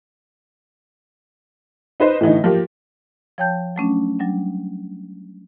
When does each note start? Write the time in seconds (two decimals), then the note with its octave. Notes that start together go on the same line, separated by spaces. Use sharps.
2.00 D#4 B4 C5
2.21 A2 D3 E3 D#4
2.44 F3 A#3 G4
3.38 F3 C#5 G5 A5 G6
3.76 F#3 A3 C#4 D4
4.19 F#3 G3 D4